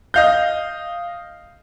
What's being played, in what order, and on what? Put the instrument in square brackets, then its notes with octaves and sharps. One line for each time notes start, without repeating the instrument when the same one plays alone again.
[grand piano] D#5 F5 G6